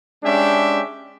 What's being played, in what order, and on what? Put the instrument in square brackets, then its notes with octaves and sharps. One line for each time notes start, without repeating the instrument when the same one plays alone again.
[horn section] G#3 C#4 D4 G4 E5